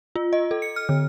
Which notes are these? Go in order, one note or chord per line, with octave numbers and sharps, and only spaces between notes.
F4
D#5
A4
C#7
F6
D3